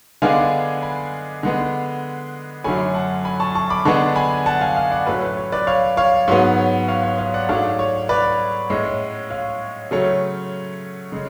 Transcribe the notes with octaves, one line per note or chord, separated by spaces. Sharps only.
D3 G#3 B3 D4 F5 G#5
G#5 B5
D3 G#3 B3
F#2 D3 F#3 A3 C#4 G#5 B5
F#5 A5
G#5 B5
A5 C#6
A5 C#6
B5 D6
D3 G#3 B3 D4 A5 C#6
G#5 B5
F#5 A5
F5 G#5
F5 G#5
D5 F#5
A2 F#3 A3 C#4 B4
B4
C#5
B4 D5
C#5 F5
C#5 F5
G#2 F#3 B3 C#5
C#5
C#5 F5
C#5
C#5 F5
D5 F#5
G#2 F#3 A3 D4 C#5 F5
C#5
B4 D5
A2 G#3 C#4
C#5 F5
C#3 F#3 A3 C#4
C#3 G#3